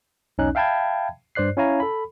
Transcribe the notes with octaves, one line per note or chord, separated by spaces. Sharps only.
B1 E2 C#4 D#4 F#6
E5 F5 G5 A5 B5 G#6
G2 C5 D5 F#6 C7
C#4 E4 C#5 F5 G#5 A#5
A4 B5